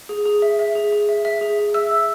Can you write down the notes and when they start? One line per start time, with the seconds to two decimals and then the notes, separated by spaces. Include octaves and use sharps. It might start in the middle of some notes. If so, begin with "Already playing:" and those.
0.09 G#4
0.25 G#4
0.42 E5
0.59 E5
0.75 G#4
0.92 G#4
1.09 E5
1.25 E5
1.41 G#4
1.58 G#4
1.74 E5 E6
1.91 E5